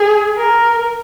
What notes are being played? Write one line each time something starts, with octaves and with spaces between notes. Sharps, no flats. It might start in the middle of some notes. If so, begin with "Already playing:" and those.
Already playing: G#4
A#4